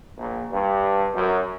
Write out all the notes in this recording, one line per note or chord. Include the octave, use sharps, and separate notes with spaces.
A#1
G2
F#2